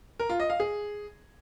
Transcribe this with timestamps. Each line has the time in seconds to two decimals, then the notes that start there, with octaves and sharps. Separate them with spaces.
0.19 A#4
0.30 F4
0.40 D#5
0.50 F5
0.60 G#4